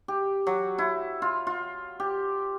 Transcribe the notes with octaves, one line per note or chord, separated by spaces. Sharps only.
G4
F#3
E4
F4
F4
G4